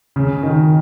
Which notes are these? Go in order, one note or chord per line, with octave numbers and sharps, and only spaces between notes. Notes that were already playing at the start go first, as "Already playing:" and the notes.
C#3
D#3